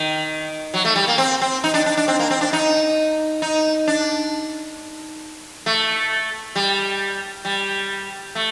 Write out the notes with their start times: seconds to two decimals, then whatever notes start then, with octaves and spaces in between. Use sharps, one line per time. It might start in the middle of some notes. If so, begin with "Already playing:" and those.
Already playing: D#3
0.74 F#3
0.85 A3
0.96 G3
1.08 A#3
1.18 C4
1.41 C4
1.64 D#4
1.74 D4
1.86 D4
1.97 D4
2.08 C4
2.19 A#3
2.30 C4
2.41 D4
2.53 D#4
3.42 D#4
3.87 D4
5.66 A3
6.55 G3
7.45 G3
8.35 A3